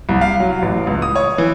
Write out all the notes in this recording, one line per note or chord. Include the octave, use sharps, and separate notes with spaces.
C2
F5
F#3
A1
C#2
D#6
C#5
E3